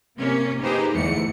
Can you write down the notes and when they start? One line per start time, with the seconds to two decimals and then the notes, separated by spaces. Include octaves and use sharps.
0.17 C3 A#3 C#4
0.63 A#3 D#4 G4 G#4 B4 C5
0.94 G1 E2 G#2 E3 A3 C#7